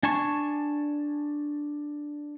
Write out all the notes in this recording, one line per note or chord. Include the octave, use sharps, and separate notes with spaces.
D4 G#5 A5 C#6